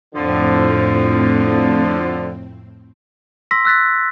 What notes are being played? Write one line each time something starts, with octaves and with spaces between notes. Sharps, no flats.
F2 A2 D3 F3 C4
C6 E6 A#6 B6
E6 F#6 A6 B6